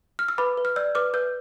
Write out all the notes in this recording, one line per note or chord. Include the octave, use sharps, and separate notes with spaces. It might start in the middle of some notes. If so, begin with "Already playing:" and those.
F6
E6
B4 B5 D6
B4
F6
D5 E6 G6
B4 D6 F6
B4 E6 G6